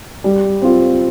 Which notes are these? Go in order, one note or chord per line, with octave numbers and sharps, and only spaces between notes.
G3
C4 F4